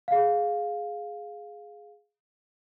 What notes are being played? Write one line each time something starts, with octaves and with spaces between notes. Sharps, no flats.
G#4 F5